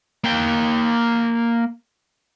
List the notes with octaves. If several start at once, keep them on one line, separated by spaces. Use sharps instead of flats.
A#3 G5